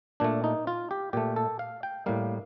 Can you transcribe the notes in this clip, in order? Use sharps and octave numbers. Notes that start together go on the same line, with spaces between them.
A#2 A3 D4
D#4
F4
G4
A#2 A3 G4
A4
F5
G5
A2 G3 A#3 F5